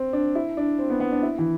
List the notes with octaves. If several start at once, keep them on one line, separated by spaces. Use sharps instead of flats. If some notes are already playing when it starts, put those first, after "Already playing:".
Already playing: C4
D4
E4
D4
C4
B3
B3
D4
E4
E3